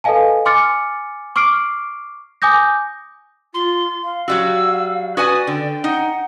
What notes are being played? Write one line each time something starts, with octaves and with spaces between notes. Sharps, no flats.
A4 B4 D#5 F5 G#5 A5
G#5 C6 D6 F6 A6 C#7
C#6 D6 F6 C7 D7
G#5 D6 D#6 G6 A#6
F4 C6
F5
F#3 G3 F#4 E6
F#4 B4 D5 G#5 D#6
D3 G5
D#4 F#5